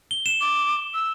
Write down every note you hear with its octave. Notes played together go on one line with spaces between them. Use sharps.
G7
E7
D6
E6